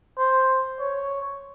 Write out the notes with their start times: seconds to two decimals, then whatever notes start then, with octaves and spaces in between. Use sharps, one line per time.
0.18 C5
0.80 C#5